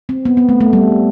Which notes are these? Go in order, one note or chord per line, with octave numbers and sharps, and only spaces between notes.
C4
B3
B3
A3
A3
G3